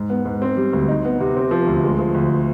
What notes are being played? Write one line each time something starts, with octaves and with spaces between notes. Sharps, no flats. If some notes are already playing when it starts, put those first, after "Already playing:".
Already playing: G#2
B3
G#2
C4
G3
D2
D#4
B3
C3
C4
F3
D2
G#3
F3
D2